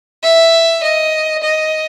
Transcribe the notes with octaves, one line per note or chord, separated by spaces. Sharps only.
E5
D#5
D#5